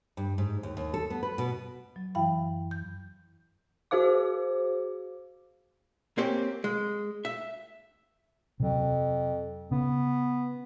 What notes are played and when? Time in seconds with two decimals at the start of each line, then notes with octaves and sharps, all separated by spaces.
0.17 G2
0.38 G#2
0.63 D#2
0.77 D#2
0.94 A4
1.10 B3
1.23 B4
1.38 B2
1.96 F#3
2.15 F#2 E3 E4 F5 G5 B5
2.71 G6
3.91 F#4 G#4 C5 F5 D6
6.18 A#3 C4 C#4 G4
6.64 G#3
7.25 E5
8.60 F2 C3 F#3
9.71 C#3 B3